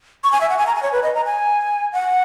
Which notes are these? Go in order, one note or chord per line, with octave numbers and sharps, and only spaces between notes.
C#6
G#5
E5
F#5
G#5
A#5
G#5
C#5
B4
D#5
A#5
G#5
F#5